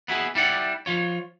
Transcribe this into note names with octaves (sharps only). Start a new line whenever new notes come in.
B3 E4 F#4 G#4
G3 E4 D5 F#5
F3 F4 C#5